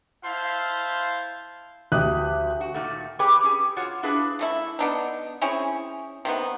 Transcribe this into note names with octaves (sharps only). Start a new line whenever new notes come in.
E4 C5 F5 A5 C6
D2 G4 D#6 F#6
F#4
A#2 D#3 A3
G4 G#4 B4 C#5 G5
C#4 G4 G#4
F4 F#4 C#5 F#5
D4 E4 F4 G#4 B4
C#3 A3 E4
B3 D4 D#4
C4 C#4 E4 G#4
C3 D#3 B3